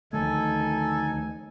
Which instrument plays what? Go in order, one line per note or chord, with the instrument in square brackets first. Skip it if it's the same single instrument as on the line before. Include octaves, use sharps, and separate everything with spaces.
[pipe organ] D2 D#4 G#5 [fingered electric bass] D#3 F3 A3 [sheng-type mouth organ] A4